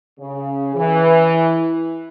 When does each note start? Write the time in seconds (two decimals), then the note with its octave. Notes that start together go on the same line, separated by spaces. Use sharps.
0.19 C#3
0.75 E3